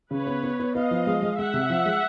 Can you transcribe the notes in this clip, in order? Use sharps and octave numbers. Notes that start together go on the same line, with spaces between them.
C#3 B4 C#5
B3
B3
B3
B3 D#5 F5
F3
G#3
G#3
G#3 E5 F#5
C3
F3
G#3